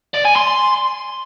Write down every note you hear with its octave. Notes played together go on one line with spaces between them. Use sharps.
D5
G#5
C6